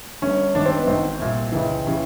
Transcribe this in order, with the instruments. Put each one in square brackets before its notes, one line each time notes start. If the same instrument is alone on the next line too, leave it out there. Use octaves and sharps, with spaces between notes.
[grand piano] G1 G2 D3 C#4
G#1 G#2 D#3 D4
C4
B3
G#1 G#2 D#3 C4
C2 A#2
C#2 C#3 E3
C#3 E3